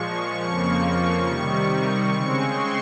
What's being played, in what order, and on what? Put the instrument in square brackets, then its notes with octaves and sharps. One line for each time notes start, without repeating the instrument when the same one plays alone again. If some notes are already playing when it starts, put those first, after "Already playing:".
Already playing: [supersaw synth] A#2 F3 G#3 C#6
F2 C#3 F3 A#3 C#6
C3 D#3 G3
C#3 G#3 C4 C#6
C6